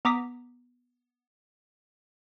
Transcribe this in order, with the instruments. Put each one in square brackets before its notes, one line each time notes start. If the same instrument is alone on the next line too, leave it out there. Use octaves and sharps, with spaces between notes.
[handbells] B3 A#5 D6 D#6 B6